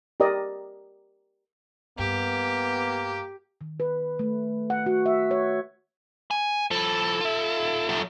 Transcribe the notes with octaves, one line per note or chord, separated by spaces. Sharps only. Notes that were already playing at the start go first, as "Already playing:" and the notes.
G4 A#4 D5 D#5
G2 A#3 B3 G4
D#3
B4
A3
F#5
F#4
E5
C#5
G#5
F3 E4 A4
F4 E5
F#3 A4